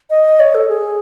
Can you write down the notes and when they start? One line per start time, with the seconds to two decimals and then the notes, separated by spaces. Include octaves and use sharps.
0.10 D#5
0.40 C#5
0.55 A4
0.69 G#4